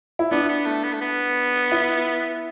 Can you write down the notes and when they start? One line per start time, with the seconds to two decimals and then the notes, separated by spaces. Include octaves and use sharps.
0.19 E4
0.31 B3 D4
0.49 B3
0.66 A3
0.83 B3
0.93 A3
1.01 B3
1.72 E4